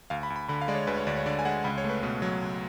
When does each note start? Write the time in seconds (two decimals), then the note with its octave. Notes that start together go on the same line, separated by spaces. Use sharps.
0.10 D2 F5
0.23 B5
0.30 D2
0.36 B5
0.49 D3 B5
0.62 F5
0.68 G#3 D5
0.75 C#5
0.87 D2 B4
0.97 C#5
1.07 D2 D5
1.17 C#5
1.26 D3 D5
1.39 G#5
1.45 G#3 F#5
1.64 C#2 B5
1.78 C#5
1.84 A3
1.90 B4
2.03 B2 B4
2.22 F#3
2.41 C#2